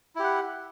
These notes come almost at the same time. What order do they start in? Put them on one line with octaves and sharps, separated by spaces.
E4 G4 F#5